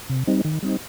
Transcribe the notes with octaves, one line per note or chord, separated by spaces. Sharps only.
C3
G3 C4 D#4
D#3
G3 C4 D#4